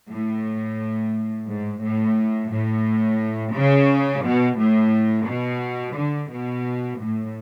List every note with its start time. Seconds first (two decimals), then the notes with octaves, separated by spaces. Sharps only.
0.10 A2
1.48 G#2
1.83 A2
2.51 A2
3.55 C#3
4.24 B2
4.59 A2
5.27 B2
5.96 D3
6.31 B2
7.00 A2